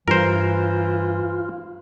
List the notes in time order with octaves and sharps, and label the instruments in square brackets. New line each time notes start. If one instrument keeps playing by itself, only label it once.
[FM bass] G2 [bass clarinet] E3 [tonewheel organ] F4 [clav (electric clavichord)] A#4 C5